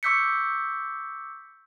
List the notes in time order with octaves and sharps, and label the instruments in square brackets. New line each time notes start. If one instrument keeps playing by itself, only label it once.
[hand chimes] C#6 D6 E6 G6 B6 C#7